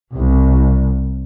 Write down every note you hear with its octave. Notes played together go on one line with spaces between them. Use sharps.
C2